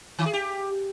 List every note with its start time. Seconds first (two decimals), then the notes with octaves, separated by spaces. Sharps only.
0.19 D#3
0.26 G#4
0.33 G4